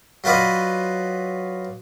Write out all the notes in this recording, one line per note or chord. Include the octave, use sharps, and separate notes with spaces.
F#3 F4 B4 D5 D#5